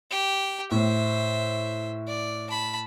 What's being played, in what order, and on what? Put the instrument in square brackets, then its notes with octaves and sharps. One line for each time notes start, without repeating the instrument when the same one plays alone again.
[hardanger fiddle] G4 G5
[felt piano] A2 [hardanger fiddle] C5 E5
[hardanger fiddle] D5
A5 B5